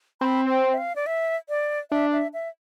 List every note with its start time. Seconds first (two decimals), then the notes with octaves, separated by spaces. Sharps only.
0.21 C4 B5
0.49 G5
0.73 E5
0.78 F5
0.96 D5
1.06 E5
1.49 D5
1.91 D4 E5
2.13 E5
2.34 E5